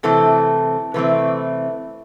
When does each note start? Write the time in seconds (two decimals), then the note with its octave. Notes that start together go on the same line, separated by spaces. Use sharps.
0.03 C3 E3 A3 C4 A4
0.94 C3 E3 A3 C4 B4